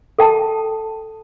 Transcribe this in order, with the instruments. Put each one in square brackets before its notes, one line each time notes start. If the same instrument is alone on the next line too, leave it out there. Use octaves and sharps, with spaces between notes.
[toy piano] A4 G5 A5